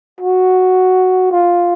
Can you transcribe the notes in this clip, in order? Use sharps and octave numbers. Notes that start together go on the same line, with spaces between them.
F#4
F4